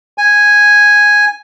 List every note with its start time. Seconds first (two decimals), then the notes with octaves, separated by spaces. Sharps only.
0.18 G#5